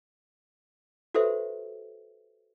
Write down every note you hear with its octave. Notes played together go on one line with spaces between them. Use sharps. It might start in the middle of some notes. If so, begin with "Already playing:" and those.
F#4 G4 A4 B4 C5 E5